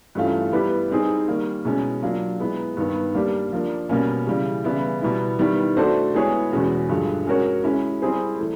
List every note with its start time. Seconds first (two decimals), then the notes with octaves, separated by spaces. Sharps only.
0.15 G2 E3 A3 C#4 F4
0.53 G3 B3 E4 G4 B4
0.90 G3 C4 D#4 G#4
1.28 D#3 G3 A#3
1.65 B2 G#3 C#4 E4
2.02 F#3 A#3 D4 F4
2.40 G#3 B3 E4
2.77 G2 D#3 G3 B3
3.15 G3 A#3 D4 G4
3.52 F3 A#3 D4
3.89 B2 G3 A#3 C#4
4.27 C#3 E3 G3
4.64 C#3 E3 G3 B3 E4
5.02 B2 G3 B3 E4
5.39 D#3 G3 B3 E4
5.77 A3 D4 F#4 A4 C5
6.14 G#3 B3 E4 G#4 C#5
6.51 E2 B2 G#3 C#4 F#4
6.89 G2 D3 F3 G#3
7.26 G#3 C#4 F#4 A#4 C#5
7.64 G#3 C#4 E4
8.02 G3 C4 E4 G#4 C5
8.38 E3 A3